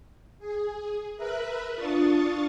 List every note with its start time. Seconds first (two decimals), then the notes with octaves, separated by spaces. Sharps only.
0.39 G#4
1.17 A#4 B4 E5 B5 F#6
1.75 D4 F4 C#6 D#6 A6